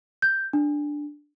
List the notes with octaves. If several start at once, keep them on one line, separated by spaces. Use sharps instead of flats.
G6
D4